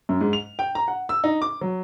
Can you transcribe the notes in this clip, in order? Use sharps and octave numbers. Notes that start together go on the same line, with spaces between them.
F#2
G#2
F7
G5
A#5
F#5
E6
D#4
D6
F#3